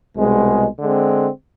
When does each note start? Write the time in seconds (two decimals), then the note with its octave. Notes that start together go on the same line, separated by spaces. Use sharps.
0.16 C2 B2 G#3
0.79 D3 G#3 C4